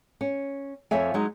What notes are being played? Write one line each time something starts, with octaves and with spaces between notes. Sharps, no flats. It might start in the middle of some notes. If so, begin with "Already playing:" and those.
C#4
F2 F3 C#5 E5 G#5
F#3 G#3 D#4